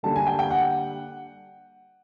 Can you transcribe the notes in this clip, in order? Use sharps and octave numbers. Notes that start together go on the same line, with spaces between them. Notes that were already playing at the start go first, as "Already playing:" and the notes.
D3 G3 A#3 A5
G#5
G5
G5
F#5